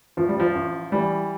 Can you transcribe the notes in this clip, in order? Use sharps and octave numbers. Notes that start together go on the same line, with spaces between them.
A1 F3
G3
F3
A1
E3 G3